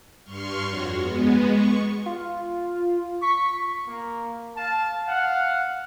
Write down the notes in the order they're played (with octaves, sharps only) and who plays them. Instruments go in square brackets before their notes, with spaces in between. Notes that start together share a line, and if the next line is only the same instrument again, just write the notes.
[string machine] G2 C6 C#6 F6
F2 F#4 C#5
G#3 B3
C#6
[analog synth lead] F4
[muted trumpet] C#6 [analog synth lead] B6
[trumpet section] A#3
F5 A5
F5 F#5